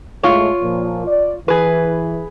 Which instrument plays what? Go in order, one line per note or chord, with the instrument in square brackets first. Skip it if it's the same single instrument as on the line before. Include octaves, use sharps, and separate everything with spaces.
[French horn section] A2 G#3 A3 [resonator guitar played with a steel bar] F4 C#5
[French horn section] A#2 F3
D5
[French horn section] E3 [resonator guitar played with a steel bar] G#4 B4